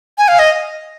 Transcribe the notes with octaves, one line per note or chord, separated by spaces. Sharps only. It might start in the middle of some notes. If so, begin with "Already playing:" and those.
G#5
F5
D#5